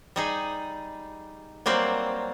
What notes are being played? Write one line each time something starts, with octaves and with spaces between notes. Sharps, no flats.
G3 D#4 G#4
F#3 G3 A#3 C4